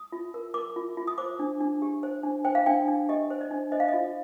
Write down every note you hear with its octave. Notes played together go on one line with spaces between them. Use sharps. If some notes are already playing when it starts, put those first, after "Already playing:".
Already playing: D#6
F4
A#4
A#4 D6
F4
F4
D#6
C5 D6
D4
D4
G4
C5
D4
C5 G5
F5
D4 G5
D4
G4 D#5
C5
D5
D4
C5 D#5
F5
F4 D#5